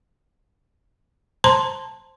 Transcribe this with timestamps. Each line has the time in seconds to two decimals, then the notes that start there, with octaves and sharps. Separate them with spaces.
1.44 C5 A5 A#5 C6